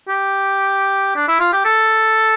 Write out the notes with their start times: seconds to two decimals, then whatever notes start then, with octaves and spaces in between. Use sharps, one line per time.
0.08 G4
1.16 D4
1.28 E4
1.40 F4
1.53 G4
1.65 A4